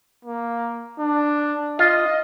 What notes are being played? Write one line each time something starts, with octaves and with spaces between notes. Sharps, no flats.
A#3
D4
F4 D#5